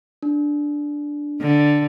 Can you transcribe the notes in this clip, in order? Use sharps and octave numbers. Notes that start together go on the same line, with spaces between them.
D4
D3